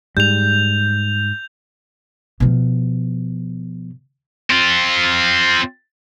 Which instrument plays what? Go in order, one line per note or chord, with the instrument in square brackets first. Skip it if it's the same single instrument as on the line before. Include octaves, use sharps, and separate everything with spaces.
[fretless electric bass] G#2 G3 [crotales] G6 F7
[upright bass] B2 F3
[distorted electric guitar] C4 F4